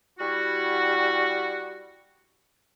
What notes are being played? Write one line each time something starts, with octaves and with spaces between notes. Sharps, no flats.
G3 E4 F#4